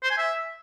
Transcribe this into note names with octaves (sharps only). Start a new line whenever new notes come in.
C5
G#5
E5